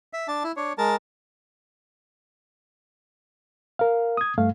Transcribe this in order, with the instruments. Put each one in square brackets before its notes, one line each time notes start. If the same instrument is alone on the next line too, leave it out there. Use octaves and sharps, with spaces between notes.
[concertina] E5
D4 A5
E4
D4 C#5
G#3 A#4 A5
[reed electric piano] A#4 F5
D#6 G#6
G2 A3 F5